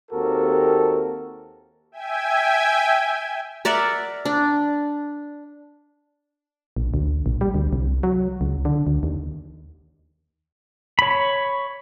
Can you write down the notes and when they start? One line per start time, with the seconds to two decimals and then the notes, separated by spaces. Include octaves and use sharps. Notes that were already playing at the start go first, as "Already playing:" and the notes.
0.11 D#2 C4 F#4 G4 A4 A#4
1.92 E5 G5 G#5 G#6
3.65 A#4 D5 E5 F#5
4.25 D4
6.77 A#1
6.94 D2
7.26 A#1
7.41 G3
7.55 D2
7.73 C2
8.03 F#3
8.41 C#2
8.65 D3
8.87 D2
9.03 D#2
10.99 C#5 B5